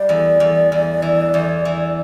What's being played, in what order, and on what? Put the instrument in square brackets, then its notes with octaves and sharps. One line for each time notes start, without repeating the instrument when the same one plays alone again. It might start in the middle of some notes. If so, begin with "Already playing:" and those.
Already playing: [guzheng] G3 [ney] D5
[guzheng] E2
E2
E2
E3
E2
E3